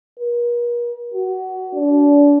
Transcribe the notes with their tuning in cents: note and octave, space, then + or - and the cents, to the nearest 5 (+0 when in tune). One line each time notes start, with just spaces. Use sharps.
A#4 +45
F#4 +20
D4 -30